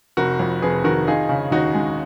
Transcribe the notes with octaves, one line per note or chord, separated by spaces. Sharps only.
F1 F#4 A#4
F2
F1 G#4 B4
D#3 F#4 A#4
D#4 F4 G#4
C#3
D#2 D#4 F#4
G#3